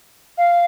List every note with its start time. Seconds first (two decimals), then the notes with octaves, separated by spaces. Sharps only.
0.38 F5